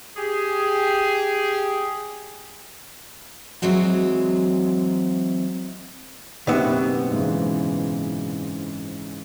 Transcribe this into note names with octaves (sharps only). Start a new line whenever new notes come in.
G4 G#4
E3 F#3 G#3 C4 F#4
F#1 B2 D#3 B3 C4 G4 E5
G#2 C#3 E3